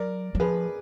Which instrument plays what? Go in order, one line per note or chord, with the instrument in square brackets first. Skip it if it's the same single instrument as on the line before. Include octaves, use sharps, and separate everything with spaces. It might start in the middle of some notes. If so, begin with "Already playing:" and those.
Already playing: [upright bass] F#3 [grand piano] A#4 D5
[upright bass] F#3
[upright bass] F3 [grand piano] G#4 B4